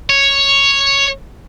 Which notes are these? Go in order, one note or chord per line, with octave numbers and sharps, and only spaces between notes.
C#5